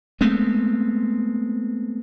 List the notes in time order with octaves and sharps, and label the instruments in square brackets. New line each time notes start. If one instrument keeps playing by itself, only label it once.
[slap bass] G#3 A3 B3 C4